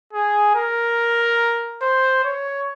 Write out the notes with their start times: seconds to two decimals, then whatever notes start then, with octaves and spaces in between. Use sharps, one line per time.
0.13 G#4
0.55 A#4
1.82 C5
2.24 C#5